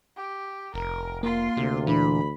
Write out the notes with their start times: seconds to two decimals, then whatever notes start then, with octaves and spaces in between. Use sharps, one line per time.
0.16 G4
0.74 F1 A#4
1.23 A#3 F4 C6
1.57 D2 C3
1.87 A#2 E3 D4 B5